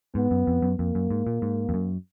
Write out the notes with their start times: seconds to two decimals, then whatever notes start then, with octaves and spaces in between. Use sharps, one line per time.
0.15 G#2 B3
0.31 F#2
0.47 F2
0.62 F#2
0.78 F2 A#3
0.95 F#2
1.10 G#2
1.27 A#2
1.42 G#2
1.69 F2
1.74 F#2